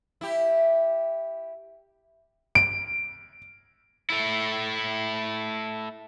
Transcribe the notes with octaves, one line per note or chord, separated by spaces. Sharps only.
E4 G4
D7
A3 E4